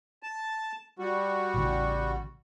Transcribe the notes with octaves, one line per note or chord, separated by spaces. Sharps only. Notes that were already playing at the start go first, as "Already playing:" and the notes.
A5
G3 F#4
A1 C#3